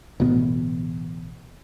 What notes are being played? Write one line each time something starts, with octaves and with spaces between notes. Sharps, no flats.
A1 D2 B2 B3